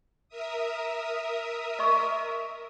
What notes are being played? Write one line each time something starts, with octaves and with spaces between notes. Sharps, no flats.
A#4 E5 D#6
D#5 C#6